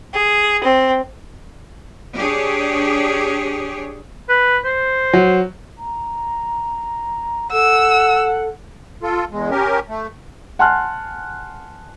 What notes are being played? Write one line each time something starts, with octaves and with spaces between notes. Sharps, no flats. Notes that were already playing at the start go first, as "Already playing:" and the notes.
G#4
C4
D4 G4 G#4 C#5
B4
C5
F#3
A#5
A4 F#5 E6
F4 A4
E2 G#3
C#4 G4 A#4
A3
F#5 G#5 A5 C6 F6 F#6